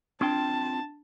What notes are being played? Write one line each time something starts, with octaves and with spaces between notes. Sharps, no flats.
C4 D4 F4 G5 A5